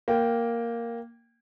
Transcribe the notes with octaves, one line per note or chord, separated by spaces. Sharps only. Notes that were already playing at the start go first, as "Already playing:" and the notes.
A#3 G5